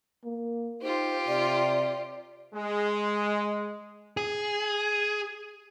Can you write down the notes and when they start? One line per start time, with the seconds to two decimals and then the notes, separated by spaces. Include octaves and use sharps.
0.24 A#3
0.82 D#4 F4 G4 C5
1.28 C3 D5
2.55 G#3
4.17 G#4